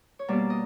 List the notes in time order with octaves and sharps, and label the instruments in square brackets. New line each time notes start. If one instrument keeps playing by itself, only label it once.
[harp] C#5
B2 G3 A#3 D5
D#5